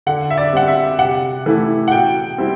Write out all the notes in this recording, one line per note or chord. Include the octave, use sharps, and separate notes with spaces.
D3 F#5
E5
D5
G3 C4 F#5
E5
C3 F#5
E3 A3 E4
F#5
B2 G5
G3 C4 E4